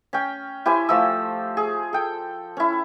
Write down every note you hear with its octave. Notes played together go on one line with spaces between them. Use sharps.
C#4 G5
E4 G4 C5 G#5
F3 A3 E6
G#4
A4 G5
C#4 E4